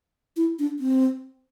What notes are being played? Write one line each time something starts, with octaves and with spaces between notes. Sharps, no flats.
E4
D4
C4